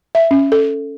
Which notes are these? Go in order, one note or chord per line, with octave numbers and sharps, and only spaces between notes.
E5
C#4
A4